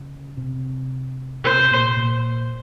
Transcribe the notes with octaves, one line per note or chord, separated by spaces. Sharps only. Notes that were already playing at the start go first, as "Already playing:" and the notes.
Already playing: C#3
C3
C3 C5
A#2
A#2